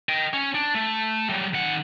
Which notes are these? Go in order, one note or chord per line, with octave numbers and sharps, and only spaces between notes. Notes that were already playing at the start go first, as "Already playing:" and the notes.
D#5 G5
C#4
D4
A3
F#3 G3
D#3 F#5